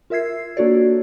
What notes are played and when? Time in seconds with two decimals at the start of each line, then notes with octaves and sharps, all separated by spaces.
0.10 F4 A#4 E5 E6 G#6 C7
0.57 A#3 D4 F#4 A4 C#5 D5